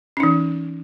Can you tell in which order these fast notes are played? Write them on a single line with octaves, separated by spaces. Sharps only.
C#4 D#4 E3